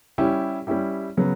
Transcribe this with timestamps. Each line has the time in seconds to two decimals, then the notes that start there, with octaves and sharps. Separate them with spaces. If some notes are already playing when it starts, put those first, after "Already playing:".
0.18 G3 C#4 E4 G4
0.67 G3 C#4 E4 G4
1.17 C#3 F#3 B3